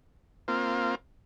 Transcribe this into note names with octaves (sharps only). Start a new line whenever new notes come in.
A#3 C4 F4